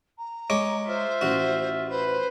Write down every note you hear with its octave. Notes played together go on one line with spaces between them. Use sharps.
A#5
G#3 C#5 D6
F4 C5 E5
A1 F#4
B4 C5